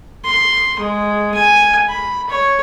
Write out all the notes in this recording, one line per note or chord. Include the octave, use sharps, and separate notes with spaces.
C6
G#3
G#5
B5
C#5